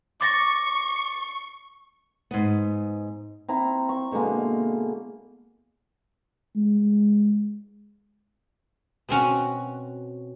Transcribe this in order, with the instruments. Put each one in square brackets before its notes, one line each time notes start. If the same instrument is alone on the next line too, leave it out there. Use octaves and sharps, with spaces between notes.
[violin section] C#6 [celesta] D6 A6 A#6
[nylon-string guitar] G#2 B3
[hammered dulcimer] C4 E4 A#5
C#6
B2 D3 G#3 A#3
[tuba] G#3
[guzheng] B2 C4 C#4 F#4